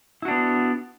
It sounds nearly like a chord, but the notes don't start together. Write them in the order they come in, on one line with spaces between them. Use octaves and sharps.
E4 F#4 D4 B3